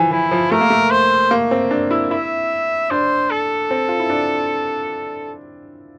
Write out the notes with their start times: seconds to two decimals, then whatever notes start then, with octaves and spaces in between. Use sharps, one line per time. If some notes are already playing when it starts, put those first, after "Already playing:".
Already playing: E3 F3
0.11 E3 E4
0.31 F3
0.51 A3 A#4
0.61 A#3
0.70 A3
0.91 C5
1.31 A#3
1.51 C4
1.71 D4
1.91 E4
2.11 E4 E5
2.90 D4 C5
3.31 A4
3.71 C4
3.89 F4
4.00 E4
4.10 D4